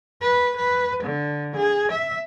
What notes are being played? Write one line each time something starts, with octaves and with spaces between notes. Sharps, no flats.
B4
B4
D3
G#4
E5